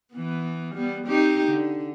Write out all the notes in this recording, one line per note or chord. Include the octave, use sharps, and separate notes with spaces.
E3 B3
G3 B3
C4 D#4 G4
D3